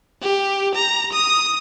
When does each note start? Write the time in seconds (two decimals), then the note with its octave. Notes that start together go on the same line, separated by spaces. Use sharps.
0.22 G4
0.75 A#5
1.13 D#6